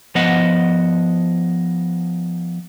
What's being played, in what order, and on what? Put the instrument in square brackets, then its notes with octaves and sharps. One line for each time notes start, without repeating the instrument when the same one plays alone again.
[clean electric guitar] F3 B3 D#5 F#5